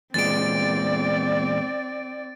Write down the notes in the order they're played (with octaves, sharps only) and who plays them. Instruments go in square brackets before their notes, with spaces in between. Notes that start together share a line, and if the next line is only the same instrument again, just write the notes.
[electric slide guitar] E2 A#2 G#3 [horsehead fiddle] C4 D5 [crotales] A6 D7